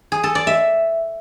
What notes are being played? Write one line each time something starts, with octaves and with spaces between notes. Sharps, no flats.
G#4
A4
D5
E5